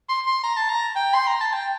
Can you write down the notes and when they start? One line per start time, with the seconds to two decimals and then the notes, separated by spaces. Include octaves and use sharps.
0.09 C6
0.27 C6
0.43 A#5
0.57 A5
0.69 A#5
0.96 G5
1.14 C6
1.27 A#5
1.41 A5
1.53 G5